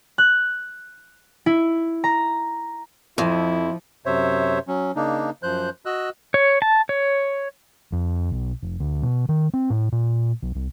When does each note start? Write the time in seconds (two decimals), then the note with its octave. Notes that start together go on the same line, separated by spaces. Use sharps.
0.18 F#6
1.46 E4
2.04 A#5
3.18 F2 F3 E4
4.06 F#2 C3 C5 C#5 E5
4.68 F#3 C#4
4.96 C#3 A#3 D4 D#4
5.43 F#2 F3 C5 F#6 G6
5.86 F#4 D#5 E6 F#6
6.34 C#5
6.62 A5
6.89 C#5
7.92 F2
8.32 B1
8.63 F1
8.80 D2
9.03 B2
9.29 D#3
9.54 C4
9.70 A2
9.92 A#2
10.42 B1
10.55 C2